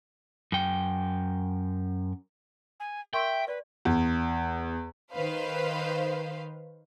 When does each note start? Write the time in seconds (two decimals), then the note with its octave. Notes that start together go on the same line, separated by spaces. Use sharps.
0.52 F#2 G5
2.80 G#5
3.13 A#4 E5 G5 C6 C#6
3.48 B4 D5
3.85 E2
5.12 D#3 B4 C5 F5